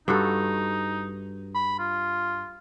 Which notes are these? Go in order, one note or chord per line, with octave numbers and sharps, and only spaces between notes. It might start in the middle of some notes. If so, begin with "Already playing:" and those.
G2 D#4 F#4 A4
B5
F4